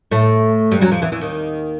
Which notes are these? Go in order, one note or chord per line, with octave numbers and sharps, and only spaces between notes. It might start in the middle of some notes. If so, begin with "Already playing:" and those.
A2 A3
G2 G3
F#2 F#3
F2 F3
E2 E3
E2 E3
D#2 D#3